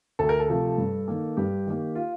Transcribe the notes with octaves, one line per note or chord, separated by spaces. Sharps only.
D2 A4
A#4
A4
C3 F3 A3
G2
D#3 A#3
G2 G4
D#3 A#3
F4